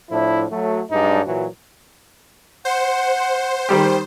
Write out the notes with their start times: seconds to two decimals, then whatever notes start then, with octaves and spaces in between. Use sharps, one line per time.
0.11 A2 F3 D4 E4
0.50 F#3 A3
0.91 G2 F#3 G#3 D4 D#4
1.26 A#2 E3 F#3
2.65 C5 F#5
3.69 D#3 G3 G4